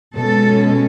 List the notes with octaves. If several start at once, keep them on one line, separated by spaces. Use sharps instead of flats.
B2 G#3 C#4 A4